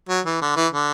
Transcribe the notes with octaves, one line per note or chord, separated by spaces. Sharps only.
F#3
E3
D3
E3
D3